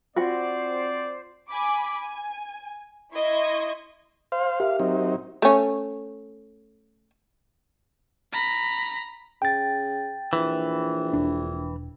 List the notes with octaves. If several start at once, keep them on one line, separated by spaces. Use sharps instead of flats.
C4 F4 F#4 C5 D5 G5
G#5 B5 D6
G#5
E4 D#5 C6 C#6 G#6
C5 F5
G4 A#4 E5 F5
F#3 C4 D#4
A3 C#4
A#5 B5
C#3 G5 A6
A#1 E3
E1 D4